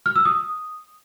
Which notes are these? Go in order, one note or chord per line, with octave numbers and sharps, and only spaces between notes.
F6
E6
D#6